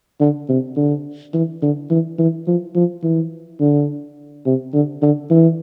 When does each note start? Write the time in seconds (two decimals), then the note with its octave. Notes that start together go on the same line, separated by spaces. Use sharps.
0.20 D3
0.49 C3
0.77 D3
1.34 E3
1.62 D3
1.90 E3
2.19 E3
2.47 F3
2.75 F3
3.03 E3
3.60 D3
4.46 C3
4.73 D3
5.02 D3
5.30 E3